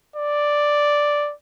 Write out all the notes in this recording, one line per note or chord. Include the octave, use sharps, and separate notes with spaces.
D5